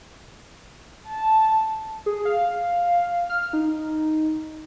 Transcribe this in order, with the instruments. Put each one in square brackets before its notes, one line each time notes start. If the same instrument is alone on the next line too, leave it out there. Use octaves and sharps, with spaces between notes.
[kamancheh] A5
[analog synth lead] G#4
F5
F6
D#4